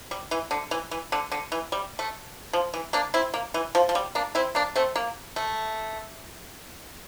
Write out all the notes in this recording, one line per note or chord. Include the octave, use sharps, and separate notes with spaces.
G3
E3
D3
E3
E3
D3
D3
E3
G3
A3
F3
E3
A#3 D4
C4 E4
A#3
E3
F3
F3
G3
A#3 D4
C4 E4
A#3 D4
A3 C4
A#3
A3